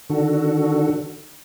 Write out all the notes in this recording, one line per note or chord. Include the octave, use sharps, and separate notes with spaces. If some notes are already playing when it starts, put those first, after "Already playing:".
D3 D#3 D4 F#4 A4